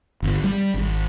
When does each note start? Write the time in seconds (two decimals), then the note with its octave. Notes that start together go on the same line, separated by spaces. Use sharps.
0.22 G1
0.44 G3
0.74 G#1